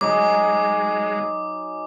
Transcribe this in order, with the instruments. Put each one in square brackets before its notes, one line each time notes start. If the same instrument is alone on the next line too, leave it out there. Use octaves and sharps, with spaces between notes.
[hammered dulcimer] F#3 D#4 G#4 [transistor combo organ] G#3 [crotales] D6